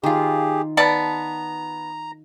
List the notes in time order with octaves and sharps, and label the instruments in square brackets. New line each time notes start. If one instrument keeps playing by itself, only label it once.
[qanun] D#3 F4 [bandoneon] G4 G#4
[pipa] B3 D5 A5 [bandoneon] A#5